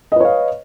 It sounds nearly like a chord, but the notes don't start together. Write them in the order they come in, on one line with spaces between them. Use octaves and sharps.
D#5 B4 C#5 F5